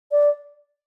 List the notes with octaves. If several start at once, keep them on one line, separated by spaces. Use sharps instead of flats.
D5